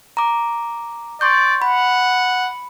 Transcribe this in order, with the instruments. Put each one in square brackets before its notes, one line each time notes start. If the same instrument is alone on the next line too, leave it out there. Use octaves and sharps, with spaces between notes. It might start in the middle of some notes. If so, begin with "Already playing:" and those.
[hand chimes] A#5 D6
[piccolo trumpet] D5 [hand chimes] C6 C#6 G6
[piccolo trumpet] F#5 [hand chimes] B5